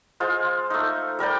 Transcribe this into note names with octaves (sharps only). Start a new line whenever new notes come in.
G#3 F4 C5
A3 D#4
G3 A#4 D5 G5